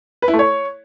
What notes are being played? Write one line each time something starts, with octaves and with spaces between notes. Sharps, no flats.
B4
E4
A3
C#5